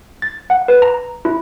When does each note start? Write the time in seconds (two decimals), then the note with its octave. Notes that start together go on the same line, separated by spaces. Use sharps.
0.22 A6
0.50 F#5
0.68 B4
0.82 A#5
1.25 E4